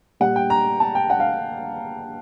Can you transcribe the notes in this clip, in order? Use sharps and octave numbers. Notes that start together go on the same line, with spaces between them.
A#2 G3 F#5
G5
A#5
A5
G5
F#5
F5